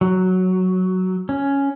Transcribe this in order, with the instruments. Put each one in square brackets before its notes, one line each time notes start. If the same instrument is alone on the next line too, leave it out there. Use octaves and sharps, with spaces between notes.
[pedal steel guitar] F#3
C#4